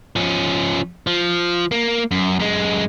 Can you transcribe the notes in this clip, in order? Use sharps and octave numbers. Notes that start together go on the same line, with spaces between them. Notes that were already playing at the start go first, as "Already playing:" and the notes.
F3 C#4
F3
A#3
F#2
F#2 G#3